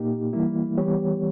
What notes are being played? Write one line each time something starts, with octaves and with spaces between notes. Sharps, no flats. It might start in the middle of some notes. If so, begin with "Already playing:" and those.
Already playing: A#2 A#3 D#4 G4
E3 G3 A#3 E4
E3 G3 B3 G4 C#5